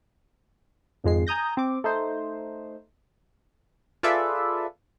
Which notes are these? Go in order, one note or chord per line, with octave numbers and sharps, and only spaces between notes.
G#1 F2 G#3 C7
G#5 A#5 D#6 G6 A#6
C4 D6
A3 D#4 C5
F4 G#4 A4 B4 D5 E5